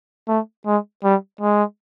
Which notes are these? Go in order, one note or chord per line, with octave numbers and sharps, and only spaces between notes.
A3
G#3
G3
G#3